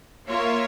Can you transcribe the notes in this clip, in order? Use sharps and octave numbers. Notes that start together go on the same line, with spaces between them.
A#3 F4 A#4 C#5 E5